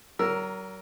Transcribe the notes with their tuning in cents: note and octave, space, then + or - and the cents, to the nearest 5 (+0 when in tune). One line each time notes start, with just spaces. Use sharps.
F#3 +40 A#4 +0 E6 +10